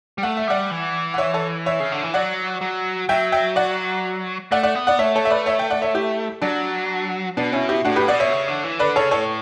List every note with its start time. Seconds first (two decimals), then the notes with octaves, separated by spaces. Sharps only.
0.18 G3
0.23 A3 F#5
0.37 E5
0.48 G3 D5 F#5
0.71 E3
1.14 F#5
1.18 C#5 E5
1.34 A4 C#5
1.66 C#5 E5
1.80 C#3
1.92 D3
2.03 E3
2.14 F#3 D5 F#5
2.61 F#3
3.09 F#3 E5 G5
3.32 E5 G5
3.56 D5 F#5
4.52 A3 D5 F#5
4.63 D5 F#5
4.75 B3
4.87 D5 F#5
4.99 A3 C#5 E5
5.16 A4 C#5
5.25 E5
5.30 B4 D5
5.46 C#5 E5
5.59 E5 G5
5.70 D5 F#5
5.82 C#5 E5
5.94 E4 G4
6.42 F#3 D4 F#4
7.37 B2 B3 D4
7.53 C#4 E4
7.69 E4 G4
7.85 A2 D4 F#4
7.96 G4 B4
8.08 B2 D5 F#5
8.20 C#5 E5
8.32 C#3
8.48 D3
8.63 E3
8.79 D3 B4 D5
8.96 C#3 A4 C#5
9.11 A2 A4 C#5